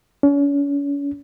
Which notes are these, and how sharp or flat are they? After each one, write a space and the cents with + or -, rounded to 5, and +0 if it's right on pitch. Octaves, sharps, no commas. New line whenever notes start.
C#4 +40